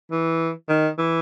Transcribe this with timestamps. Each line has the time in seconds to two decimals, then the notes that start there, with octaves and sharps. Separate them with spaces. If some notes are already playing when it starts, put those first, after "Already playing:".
0.11 E3
0.69 D#3
0.98 E3